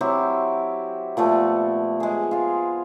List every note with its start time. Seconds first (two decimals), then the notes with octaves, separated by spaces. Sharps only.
0.01 F#3 C4 E4 G4
1.17 A#2 F3 A3 B3
2.00 G#3 G#4
2.31 F4 F5